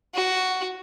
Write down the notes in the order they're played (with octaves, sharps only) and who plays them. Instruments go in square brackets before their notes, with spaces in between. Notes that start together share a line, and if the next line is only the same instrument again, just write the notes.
[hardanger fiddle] F#4